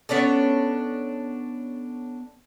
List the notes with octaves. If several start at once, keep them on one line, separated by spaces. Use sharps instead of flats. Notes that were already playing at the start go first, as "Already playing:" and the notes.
B3 C#4 D4 A4